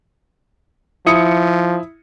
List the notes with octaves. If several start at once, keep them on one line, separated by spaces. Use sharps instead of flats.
F3 E4 D#6 C#7